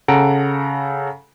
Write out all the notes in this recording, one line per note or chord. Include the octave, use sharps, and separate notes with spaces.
C#3 A4 F#5 A#5 D7